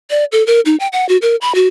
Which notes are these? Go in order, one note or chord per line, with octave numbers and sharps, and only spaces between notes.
D5
A4
A#4
D#4
G5
F#5
F#4
A#4
B5
F#4